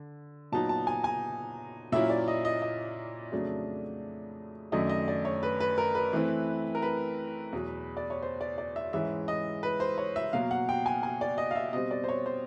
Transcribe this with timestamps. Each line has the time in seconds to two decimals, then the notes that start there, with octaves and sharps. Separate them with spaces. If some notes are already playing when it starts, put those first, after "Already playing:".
Already playing: D3
0.52 A#2 F#3 B3 D#4 A5
0.69 A5
0.87 G#5
1.04 G#5
1.92 A#2 F#3 A#3 C#4 E4 E5
2.10 D5
2.28 D#5
2.45 D#5
2.62 D#5
3.32 F2 C#3 F#3 A3 D4
4.72 F#2 D#3 F#3 A3 D4 D#5
4.89 D#5
5.08 D5
5.25 C#5
5.43 B4
5.60 B4
5.78 A#4
5.95 B4
6.13 E3 A3 C4 E4
6.75 A#4
6.82 B4
7.53 E2 B2 F#3
7.97 D5
8.10 C#5
8.22 C5
8.41 D5
8.58 D5
8.76 E5
8.93 G#2 E3 G#3 C#4 E5
9.28 D#5
9.63 B4
9.80 C5
9.98 C#5
10.16 E5
10.33 B2 F#3 A#3 F5
10.51 F#5
10.69 G5
10.86 G#5
11.03 G#5
11.21 D5
11.38 D#5
11.51 F5
11.56 E5
11.73 B2 G3 C4 D#5
11.91 D5
12.04 C5
12.09 C#5
12.26 C5